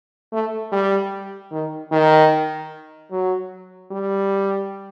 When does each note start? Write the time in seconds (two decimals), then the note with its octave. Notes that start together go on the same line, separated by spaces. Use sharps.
0.33 A3
0.72 G3
1.52 D#3
1.92 D#3
3.11 F#3
3.91 G3